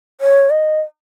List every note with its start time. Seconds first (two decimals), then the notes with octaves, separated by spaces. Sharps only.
0.21 C#5
0.50 D#5